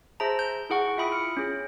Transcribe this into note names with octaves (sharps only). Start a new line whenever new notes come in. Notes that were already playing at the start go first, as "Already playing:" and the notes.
G#4 C5 E5 A5 A#5
G6
E4 G#4 F#5 C#6
E4 F4 E5 G5 B5 D#6
F6 C#7
C#4 G#4